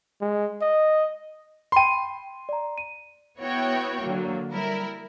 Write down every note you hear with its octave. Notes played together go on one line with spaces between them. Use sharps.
G#3
D#5
G5 B5 C6 D#7
D5 A#5
D#7
B3 E4 F#4 C#5 G5
D3 F#3 A#3
G3 E4 A#4